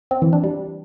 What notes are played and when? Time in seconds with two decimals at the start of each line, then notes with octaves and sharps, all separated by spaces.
0.11 C4
0.22 E3
0.33 D4
0.44 G3